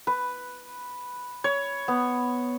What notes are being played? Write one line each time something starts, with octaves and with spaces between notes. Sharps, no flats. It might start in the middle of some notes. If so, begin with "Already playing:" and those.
B4
C#5
B3